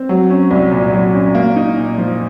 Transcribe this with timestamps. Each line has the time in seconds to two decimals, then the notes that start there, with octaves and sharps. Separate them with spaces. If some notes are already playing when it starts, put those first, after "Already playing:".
Already playing: C4
0.09 F#3
0.30 C#4
0.51 C2
0.71 A#2
0.93 F#3
1.14 C#4
1.35 A#3
1.56 D#4
1.77 A#2
1.98 F3